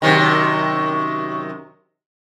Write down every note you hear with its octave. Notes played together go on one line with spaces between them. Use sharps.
F#2 C3 D#3 C#6